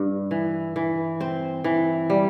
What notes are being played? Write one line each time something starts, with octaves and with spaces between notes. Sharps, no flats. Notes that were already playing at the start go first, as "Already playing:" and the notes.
Already playing: G2
E3
E3
C4
E3
G3